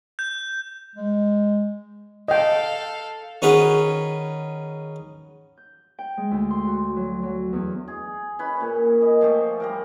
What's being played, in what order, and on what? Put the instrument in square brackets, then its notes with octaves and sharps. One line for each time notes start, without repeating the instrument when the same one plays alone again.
[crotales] G6
[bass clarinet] G#3
[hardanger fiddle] A4 F5 [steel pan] D#5 G5
[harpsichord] D#3 C#4 F#4 G#4 B4
[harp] G6
G5
G#3
D2
C6
F#4
F#3
F#3
E2
[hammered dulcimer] G#4
C#4 B4 B5
A#2
D#5
F3 A3 G4
G3 G4 A#4